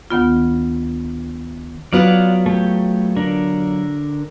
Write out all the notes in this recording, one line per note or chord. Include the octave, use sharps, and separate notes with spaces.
D2 D#3 B3 F4
F#3 B3 F4 D5 F5 F#5
A3 G4
D3 D4 A#4